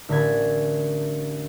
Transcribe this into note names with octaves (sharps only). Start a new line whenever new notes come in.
A1 D3 A#4 B5 G#6 A6